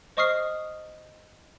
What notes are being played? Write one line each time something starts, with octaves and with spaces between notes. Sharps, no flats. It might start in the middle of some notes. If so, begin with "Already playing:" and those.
C5 D#5 C#6 D#6 F6 C7